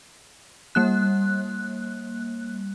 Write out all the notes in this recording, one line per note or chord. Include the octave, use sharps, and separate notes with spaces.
G3 A#3 F#6